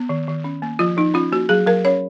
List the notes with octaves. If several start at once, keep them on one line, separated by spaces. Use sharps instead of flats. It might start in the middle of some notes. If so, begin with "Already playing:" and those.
Already playing: B3
D#3
D#3
C#4
A#3
F3 F4
F3 D#4
C#4 F4
A#3 F#4
F#3 G#4
F#3 A#4
C#4 C#5